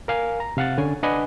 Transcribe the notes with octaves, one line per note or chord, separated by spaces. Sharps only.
A#4 F5 G#5
A#5
C3 F5 F#5 A6
D3 C#4 G#5
D4 B4 D#5 F#5 G#5 B5